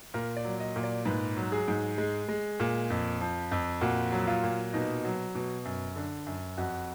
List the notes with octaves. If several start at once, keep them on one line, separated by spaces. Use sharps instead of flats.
A#2 A#4
D5
F#3
D#5
A#2
D5
G#2 B4
F#3
G#4
G#2
G#3
G#3
A#2
F2
F3
F2
A#2 F#4
F#3
F4
A#2
B2 D#4
F#3
B2
F#2
D3
F#2
F2 F#4